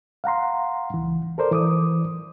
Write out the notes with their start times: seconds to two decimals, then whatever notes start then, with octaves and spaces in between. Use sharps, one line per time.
0.24 F5 F#5 A#5 C6
0.94 C#2 E3
1.38 A4 A#4 C5 D5
1.51 E3 D6 D#6